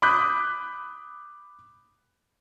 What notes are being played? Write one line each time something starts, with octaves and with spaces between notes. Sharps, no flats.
B5 D6 D#6 F#6 G6 B6